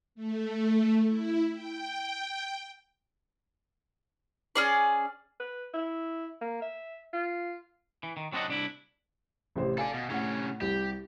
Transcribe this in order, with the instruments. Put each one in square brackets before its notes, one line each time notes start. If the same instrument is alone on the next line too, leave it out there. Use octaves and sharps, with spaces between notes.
[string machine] A3
E4
G5
[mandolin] C#4 G#4 D5
[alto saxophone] B4
E4
A#3
E5
F4
[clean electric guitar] E3
D#3
F#3 C4 D4 B4 D#5 F#5
C2 D4 E4
[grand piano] A1 C3 C5
[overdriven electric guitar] A4 D5 [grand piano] F5 G#5
[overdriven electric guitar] B2
[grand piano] A2 F#5 [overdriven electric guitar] C3 C#4
[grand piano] C2 [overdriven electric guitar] G4